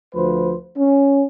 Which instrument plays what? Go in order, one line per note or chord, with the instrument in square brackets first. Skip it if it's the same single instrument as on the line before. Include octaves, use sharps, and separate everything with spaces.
[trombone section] D2 F3 B4 C5
C#4